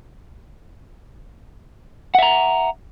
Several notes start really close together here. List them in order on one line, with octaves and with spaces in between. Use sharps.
F#5 E5 A#5